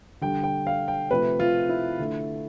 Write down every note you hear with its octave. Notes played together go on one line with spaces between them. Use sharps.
D3 G3 G5
G5
F5
G5
C3 F3 A3 B4
F4
E4
D3 A3